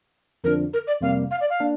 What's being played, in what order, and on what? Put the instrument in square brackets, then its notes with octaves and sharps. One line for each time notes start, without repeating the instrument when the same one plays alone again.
[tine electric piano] F2 D3 F3 D4 [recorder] A#4
[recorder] A#4
D5
[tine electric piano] F2 C3 G3 A#3 [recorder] F5
[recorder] F5
D5
F5
[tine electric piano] A#3 D4